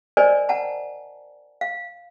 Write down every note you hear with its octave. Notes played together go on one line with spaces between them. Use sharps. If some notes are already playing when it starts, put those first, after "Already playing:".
A#4 C5 D5 D#5 G#5
F#5 A5 A#5
F5